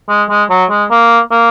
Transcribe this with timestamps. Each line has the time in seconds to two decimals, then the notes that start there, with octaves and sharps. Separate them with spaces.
0.09 G#3
0.30 G#3
0.50 F#3
0.70 G#3
0.91 A#3
1.31 A#3